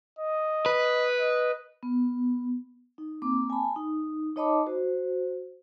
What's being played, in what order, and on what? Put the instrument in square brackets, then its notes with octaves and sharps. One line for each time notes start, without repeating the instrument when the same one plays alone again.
[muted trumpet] D#5
[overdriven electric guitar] B4
[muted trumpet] D#5
[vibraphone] B3
D#4
A#3 C4 D6
G#5 A5 B5
D#4
D#4 C#5 D#5 A5 B5 D6
F#4 C5